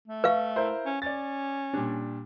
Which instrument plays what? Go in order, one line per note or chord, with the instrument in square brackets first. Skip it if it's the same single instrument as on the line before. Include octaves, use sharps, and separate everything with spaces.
[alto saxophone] A3
[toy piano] B4 F5 [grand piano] E5 C#6
[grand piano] E4 A#4 C5
[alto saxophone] C#4
[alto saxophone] C#4 [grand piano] D5 A6
[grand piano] A#2 G3 D4